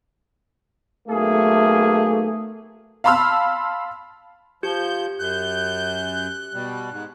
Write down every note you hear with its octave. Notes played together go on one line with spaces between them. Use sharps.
B1 A3 A#3 G#4
F5 A5 B5 C6 E6 F6
F3 G4 G6
F#2 F#6 G6
B2 G3
G#2